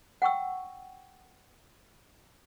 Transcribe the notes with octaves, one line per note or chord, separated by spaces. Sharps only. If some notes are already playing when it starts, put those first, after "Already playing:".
F#5 G5 C#6 E6